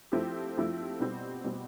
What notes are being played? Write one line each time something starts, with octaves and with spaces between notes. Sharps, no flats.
F3 A3 C4 E4 G4
F3 A3 C4 E4 G4
B2 G3 C4
B2 G3 C4